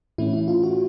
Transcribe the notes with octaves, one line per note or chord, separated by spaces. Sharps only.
A2 E3 A3 C#4 E4
E4
F4
F#4